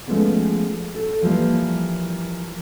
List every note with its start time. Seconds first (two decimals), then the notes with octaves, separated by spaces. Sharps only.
0.07 F3 G#3 A3 B3 C#4
0.95 A4
1.22 E3 F3 G3 A#3